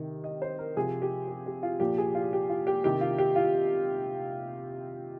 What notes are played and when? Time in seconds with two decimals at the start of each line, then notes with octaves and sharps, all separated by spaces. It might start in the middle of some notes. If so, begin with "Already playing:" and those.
Already playing: C3 D#3
0.24 D#5
0.42 C5
0.58 A#4
0.77 C3 F3 G#4
1.02 G4
1.28 G4
1.46 G4
1.63 F4
1.80 A#2 F3 G4
1.98 G#4
2.15 F4
2.33 G4
2.49 F4
2.67 G4
2.84 C3 D#3 G4
3.01 F4
3.18 G4
3.36 F4